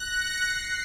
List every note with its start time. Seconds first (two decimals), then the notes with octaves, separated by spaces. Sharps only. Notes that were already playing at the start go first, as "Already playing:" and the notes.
Already playing: F#6 A#6
0.12 C#7
0.44 C7